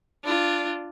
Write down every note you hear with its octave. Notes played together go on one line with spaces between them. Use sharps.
D4 F4